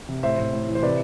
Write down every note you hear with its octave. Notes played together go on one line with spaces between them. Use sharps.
C3
A2 C5 E5
A2
A2
E3
C5
C3 B4 D5